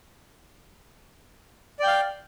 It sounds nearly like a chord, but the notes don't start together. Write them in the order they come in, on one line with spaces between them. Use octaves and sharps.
D5 G5 F5